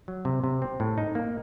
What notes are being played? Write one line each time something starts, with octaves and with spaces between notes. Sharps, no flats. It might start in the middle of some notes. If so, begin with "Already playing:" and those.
F#3
C3
C3
C4
A2
D#4
A#3